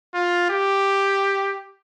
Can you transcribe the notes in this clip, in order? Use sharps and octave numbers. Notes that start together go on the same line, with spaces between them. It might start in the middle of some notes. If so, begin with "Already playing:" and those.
F4
G4